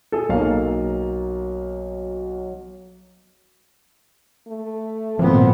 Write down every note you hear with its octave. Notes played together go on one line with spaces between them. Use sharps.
G#4 A4
B1 F#3 A#3 F5
A3
G#1 A#2 F3 B3 C4